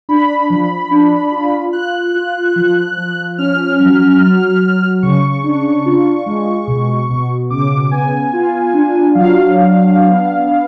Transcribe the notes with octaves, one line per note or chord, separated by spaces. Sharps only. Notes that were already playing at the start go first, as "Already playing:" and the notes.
D4 B5
F3
D4
F4
F4 F#6
F4
F3
F3
C#4 F6
F#3
F#3
F#3
C#3 C#6
D4
F4
G#3
B2
B2
C#3 D6
B3 G#5
F4
D4
F#3 F5
D4
B3
B3